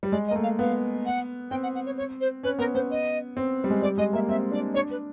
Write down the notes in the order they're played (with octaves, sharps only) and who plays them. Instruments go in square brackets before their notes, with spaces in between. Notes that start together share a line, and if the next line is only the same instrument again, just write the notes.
[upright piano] G3
[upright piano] G#3 [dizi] D5
[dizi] D#5
[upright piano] A#3
A3
[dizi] F5
[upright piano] B3 [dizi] F5
[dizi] F#5
[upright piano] C4 [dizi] G5
[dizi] F#5
F#5
C#5
C#5
C5
[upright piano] C#4 [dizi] B4
[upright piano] B3 [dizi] A#4
[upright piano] B3 [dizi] C5
[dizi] D#5
[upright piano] C4
G3
G#3
[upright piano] G3 [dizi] D5
[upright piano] G#3 [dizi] D#5
[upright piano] A#3 [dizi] E5
[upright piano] C4 [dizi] E5
[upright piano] D4 [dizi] D5
[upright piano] D4 [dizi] C#5
[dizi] B4